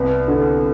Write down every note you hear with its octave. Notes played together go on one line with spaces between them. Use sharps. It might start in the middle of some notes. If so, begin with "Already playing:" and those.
Already playing: C2 B3
D3